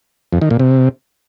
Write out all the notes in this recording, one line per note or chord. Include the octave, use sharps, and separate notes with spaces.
F2
D#3
A#2
C3